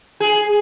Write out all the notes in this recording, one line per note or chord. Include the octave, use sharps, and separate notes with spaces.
G#4